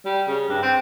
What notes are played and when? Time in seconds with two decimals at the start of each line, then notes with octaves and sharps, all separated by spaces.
0.05 G3
0.28 C#3
0.49 G2
0.62 C4